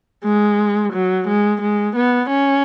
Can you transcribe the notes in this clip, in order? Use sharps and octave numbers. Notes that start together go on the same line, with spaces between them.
G#3
F#3
G#3
G#3
B3
C#4